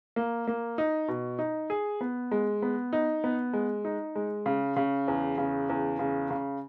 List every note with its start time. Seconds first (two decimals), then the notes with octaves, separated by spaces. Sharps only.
0.16 A#3
0.47 A#3
0.78 D#4
1.08 B2
1.39 D#4
1.70 G#4
2.01 B3
2.31 G#3
2.62 B3
2.93 D#4
3.24 B3
3.53 G#3
3.85 D#4
4.16 G#3
4.46 C#3
4.76 C#3
5.08 E2
5.38 C#3
5.69 E2
5.99 C#3
6.30 C#3